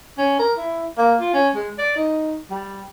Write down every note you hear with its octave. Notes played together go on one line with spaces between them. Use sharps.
C#4
A#4
E4
A#3
F4
C#4
G#3
D5
D#4
G3